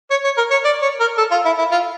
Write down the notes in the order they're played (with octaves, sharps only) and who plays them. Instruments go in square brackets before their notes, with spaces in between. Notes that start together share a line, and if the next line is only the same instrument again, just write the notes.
[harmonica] C#5
C#5
A#4
C#5
D5
C#5
A#4
A4
F4
E4
E4
F4